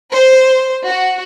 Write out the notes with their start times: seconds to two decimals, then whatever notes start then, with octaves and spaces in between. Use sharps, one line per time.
0.13 C5
0.86 F#4